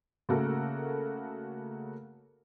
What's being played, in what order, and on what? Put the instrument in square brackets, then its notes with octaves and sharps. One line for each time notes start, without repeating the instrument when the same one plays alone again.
[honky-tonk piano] C#3 A3 A#3 F#4 A4 A#4